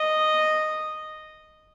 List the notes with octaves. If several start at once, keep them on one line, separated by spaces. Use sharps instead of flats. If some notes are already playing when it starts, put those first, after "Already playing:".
Already playing: D#5